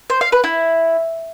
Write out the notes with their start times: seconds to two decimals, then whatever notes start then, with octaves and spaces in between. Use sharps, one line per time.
0.10 C5
0.21 F5
0.32 B4
0.44 E4